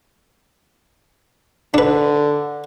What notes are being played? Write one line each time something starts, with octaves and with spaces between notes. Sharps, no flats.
D3 D4 B4